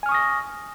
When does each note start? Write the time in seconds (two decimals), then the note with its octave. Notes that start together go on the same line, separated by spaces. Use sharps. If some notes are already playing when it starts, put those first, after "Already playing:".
0.03 G#5
0.06 F6
0.09 C#6
0.12 D#6
0.14 A#6